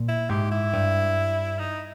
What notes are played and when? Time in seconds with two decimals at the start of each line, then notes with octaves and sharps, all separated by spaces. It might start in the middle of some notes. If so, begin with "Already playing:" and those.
Already playing: A#2
0.09 E4
0.29 G#2 G4
0.52 E4
0.73 G2
1.59 D#4